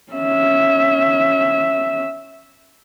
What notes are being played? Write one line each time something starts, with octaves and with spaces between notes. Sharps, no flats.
C#4 E5